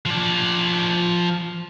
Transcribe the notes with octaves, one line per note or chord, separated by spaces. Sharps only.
F3 D5